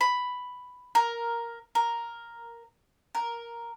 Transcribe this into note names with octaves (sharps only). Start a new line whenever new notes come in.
B5
A#4
A#4
A#4